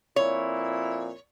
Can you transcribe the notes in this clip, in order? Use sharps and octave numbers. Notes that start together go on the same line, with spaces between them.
F2 A#2 E4 C#5